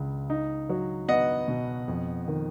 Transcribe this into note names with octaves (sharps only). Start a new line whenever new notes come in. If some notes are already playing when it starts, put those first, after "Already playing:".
Already playing: C#2 C#3
D#4
F#3
B3 D#5 F#5
B2
F2
D#3